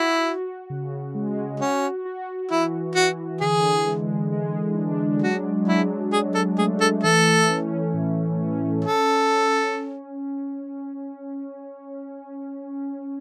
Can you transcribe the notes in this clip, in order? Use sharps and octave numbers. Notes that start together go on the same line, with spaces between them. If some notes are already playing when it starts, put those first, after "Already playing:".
Already playing: E4 F#4
F#4
C#3
G#3
C#4 F#4
F#4
E3 E4
E3 F#4
D3 G#4
G#3
G#3
D4
F#3 F#4
F#3 E4
F#3 G#4
A4
A3 G#4
A4
E3 A4
C#4
A2
C#4
C#4 A4